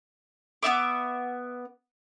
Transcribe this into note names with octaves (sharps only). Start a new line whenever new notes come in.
B3 E4 E5 D6